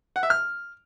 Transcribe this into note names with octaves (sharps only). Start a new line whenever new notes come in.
F#5
E5
F6